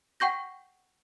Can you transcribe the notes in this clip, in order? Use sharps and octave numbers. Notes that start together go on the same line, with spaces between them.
F#5 G5 C#6 G6 A#6